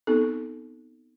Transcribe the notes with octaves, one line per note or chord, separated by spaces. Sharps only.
B3 C4 D#4 A4